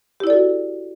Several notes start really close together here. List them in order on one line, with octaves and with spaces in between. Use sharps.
G4 E4 D5 A4 F#4